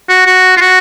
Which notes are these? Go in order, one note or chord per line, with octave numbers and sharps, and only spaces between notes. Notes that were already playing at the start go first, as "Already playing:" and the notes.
F#4
F#4
F4
F#4